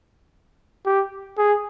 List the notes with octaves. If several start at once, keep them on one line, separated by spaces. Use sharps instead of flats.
G4
G#4